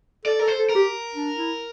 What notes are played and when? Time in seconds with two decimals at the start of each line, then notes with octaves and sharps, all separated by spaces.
0.25 A4 D5
0.39 A4 A#4
0.48 C5
0.58 A4
0.69 A#4
0.75 G4
1.14 D4
1.36 E4